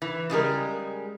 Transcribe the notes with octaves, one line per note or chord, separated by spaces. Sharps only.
E3
C#3 G3 G#3 A#4